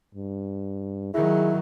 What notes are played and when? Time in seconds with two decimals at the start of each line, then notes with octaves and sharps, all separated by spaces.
0.15 G2
1.14 D#3 F#3 E4 G#4